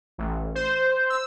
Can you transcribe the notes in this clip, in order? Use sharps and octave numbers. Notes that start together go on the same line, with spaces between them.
A1
C5
E6